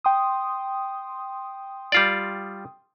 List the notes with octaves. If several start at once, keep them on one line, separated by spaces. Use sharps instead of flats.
G5 C6 D#6
G3 F4 D5